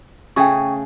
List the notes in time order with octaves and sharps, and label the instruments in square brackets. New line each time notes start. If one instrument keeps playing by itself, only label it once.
[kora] C#3 A3 G#4 [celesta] G5 C#6